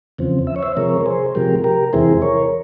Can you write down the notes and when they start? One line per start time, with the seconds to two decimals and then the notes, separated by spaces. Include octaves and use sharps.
0.18 E2 C#3 F3 C4
0.47 E5
0.56 C#5
0.63 C5 E5
0.77 C3 F3 G#3 A#4 C#5
1.01 A#4
1.06 G#4 C5
1.35 C3 F3 G#3 G4 A#4
1.64 G4 A#4
1.93 E2 C3 E3 G#3 E4 G#4 C5
2.22 A#4 C#5